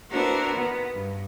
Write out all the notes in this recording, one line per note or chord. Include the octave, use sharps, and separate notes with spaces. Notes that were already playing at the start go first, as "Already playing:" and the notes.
B3 D4 E4 F#4 A#4 C5
D#3 B3
G2